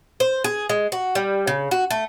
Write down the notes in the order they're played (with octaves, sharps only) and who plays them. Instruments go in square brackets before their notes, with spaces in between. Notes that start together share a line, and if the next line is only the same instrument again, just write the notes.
[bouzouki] C5
G#4
G#3
F#4
G3
C#3
F#4
A3